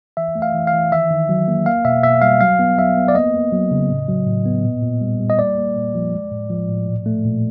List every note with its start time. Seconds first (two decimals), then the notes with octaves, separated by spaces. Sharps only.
0.17 E3 E5
0.35 A3
0.42 F5
0.54 E3
0.67 F5
0.74 E3
0.92 D#3 E5
1.10 D#3
1.29 F#3
1.48 A#3
1.66 A#3 F5
1.85 B2 E5
2.03 B2 E5
2.22 G3 F5
2.41 F#3 F5
2.59 B3
2.78 F#3 E5
2.97 B3
3.08 D5
3.15 A#3 D#5
3.34 A#3
3.52 F#3
3.71 C#3
3.89 A2
4.08 F#3
4.26 A2
4.46 B3
4.64 A#2
4.82 A#2
5.01 G3
5.20 G3
5.30 D#5
5.39 A#3 D5
5.57 A#3
5.76 A#2
5.95 F3
6.13 G#3
6.32 A2
6.50 F3
6.69 A2
6.87 A#2
7.06 A3
7.25 A#2